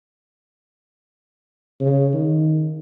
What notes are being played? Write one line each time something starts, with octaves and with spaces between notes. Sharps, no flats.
C#3
D#3